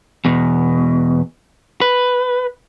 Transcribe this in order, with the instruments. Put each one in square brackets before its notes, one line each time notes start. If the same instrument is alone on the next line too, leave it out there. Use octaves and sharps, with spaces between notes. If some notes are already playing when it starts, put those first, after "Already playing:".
[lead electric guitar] E2 B2
B4